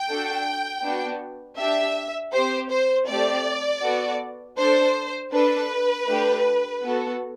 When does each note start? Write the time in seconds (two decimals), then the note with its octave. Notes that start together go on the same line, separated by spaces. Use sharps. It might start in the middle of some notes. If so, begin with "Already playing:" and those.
Already playing: G5
0.09 D4 F#4 A4
0.83 B3 D4 F#4
1.58 D4 G4 E5
2.33 C4 G4 C5
2.71 C5
3.08 A3 C4 G4 D5
3.82 B3 F#4 A4
4.58 D4 A4 C5
5.32 D4 A4 B4
6.08 A3 D4 G4
6.82 B3 F#4 A4